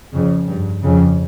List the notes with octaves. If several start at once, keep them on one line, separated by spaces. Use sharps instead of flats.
F2 C#3
G2
F2 C#3